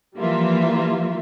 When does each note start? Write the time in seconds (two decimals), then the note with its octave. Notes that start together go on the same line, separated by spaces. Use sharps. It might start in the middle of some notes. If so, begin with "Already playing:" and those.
0.16 E3 F3 G3 A#3 F4 E5